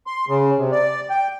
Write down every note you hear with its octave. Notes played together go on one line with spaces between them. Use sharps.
C6
C#3
C3
D5
G5